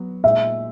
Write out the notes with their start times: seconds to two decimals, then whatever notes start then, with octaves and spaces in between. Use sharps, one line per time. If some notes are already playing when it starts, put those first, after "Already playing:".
Already playing: F#3 B3
0.24 A#2 G#3 D#4 E5